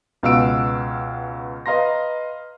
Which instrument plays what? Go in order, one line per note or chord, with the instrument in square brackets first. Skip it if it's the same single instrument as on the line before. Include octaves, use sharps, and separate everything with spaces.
[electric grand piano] C#2 B2 F5 F#5 E6 D7
B4 D#5 F5 A#5 C6 A#6